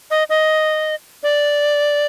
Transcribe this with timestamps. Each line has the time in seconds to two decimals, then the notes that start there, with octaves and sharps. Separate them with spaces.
0.11 D#5
0.30 D#5
1.23 D5